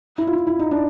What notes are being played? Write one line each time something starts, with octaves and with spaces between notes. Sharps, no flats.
E4
F4
E4
E4
D#4
D4